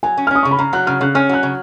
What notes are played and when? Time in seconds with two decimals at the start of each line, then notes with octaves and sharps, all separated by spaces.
0.03 F#3 G#5
0.18 C#4
0.27 F6
0.31 C#4 D#6
0.43 C#3 C#6
0.51 B5
0.59 C#3 A#5
0.73 F#3 F#6
0.87 C#3 F6
1.01 C#3 F#6
1.15 C#4 F6
1.29 F#3 F#6
1.43 C#3